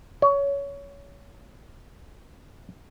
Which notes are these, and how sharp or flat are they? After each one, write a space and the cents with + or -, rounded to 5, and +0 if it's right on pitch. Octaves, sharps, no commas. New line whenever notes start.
C#5 +20